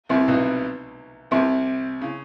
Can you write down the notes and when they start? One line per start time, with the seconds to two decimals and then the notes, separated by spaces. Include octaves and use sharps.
0.09 C2 C3
0.27 B1 B2
1.31 C2 C3
2.01 C#3